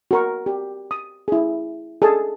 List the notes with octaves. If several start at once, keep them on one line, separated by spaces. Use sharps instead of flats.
F#4 A#4 C#6
G4
D#6
E4 G#4
G#4 A4 A5